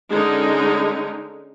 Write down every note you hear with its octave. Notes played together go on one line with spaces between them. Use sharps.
D3 G#3 C#4 D#4